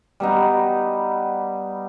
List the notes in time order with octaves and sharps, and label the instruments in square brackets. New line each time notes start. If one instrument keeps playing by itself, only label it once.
[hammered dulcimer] G3 B3 D#4